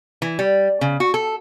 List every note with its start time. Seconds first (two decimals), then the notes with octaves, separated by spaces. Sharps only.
0.22 E3
0.39 G3
0.81 C#3
1.00 F#4
1.14 A4